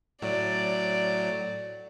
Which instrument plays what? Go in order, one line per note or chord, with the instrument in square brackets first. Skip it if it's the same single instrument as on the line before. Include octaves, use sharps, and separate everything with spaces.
[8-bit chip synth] A2 F#3 [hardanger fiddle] D5